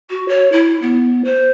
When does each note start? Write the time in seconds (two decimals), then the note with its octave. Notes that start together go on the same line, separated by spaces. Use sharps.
0.10 F#4
0.28 C#5
0.52 E4
0.82 B3
1.24 C5